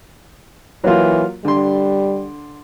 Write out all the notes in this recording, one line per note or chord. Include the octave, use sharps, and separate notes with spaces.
E3 F#3 A#3 F4
D3 G3 C6